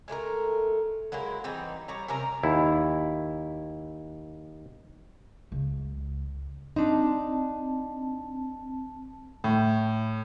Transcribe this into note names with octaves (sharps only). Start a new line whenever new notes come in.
G#3 A3 G4 A#4
F#3 G#3 A#3 E4
E3 G3 C4 D#4
G3 C#5 A#5
C3 C#4 A#4 A#5
D#2 E4
C#2
C4 D4 D#4 A5
A2